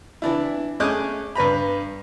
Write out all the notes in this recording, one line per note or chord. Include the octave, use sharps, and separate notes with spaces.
E3 D4 E4
A3 C#4 G#4 D#5 D6 F#6
G2 B4 A#5 B5